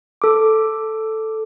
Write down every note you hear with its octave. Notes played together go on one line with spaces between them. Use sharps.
A4 D6